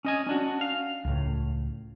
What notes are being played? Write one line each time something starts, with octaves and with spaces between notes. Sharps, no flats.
C#4 D#5 G#5
C#4 D4 F#4
F5
C#2 A2